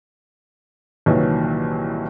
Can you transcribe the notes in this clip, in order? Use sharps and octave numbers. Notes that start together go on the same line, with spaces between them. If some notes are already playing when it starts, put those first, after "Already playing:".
C2 A#2 D#3 E3 F#3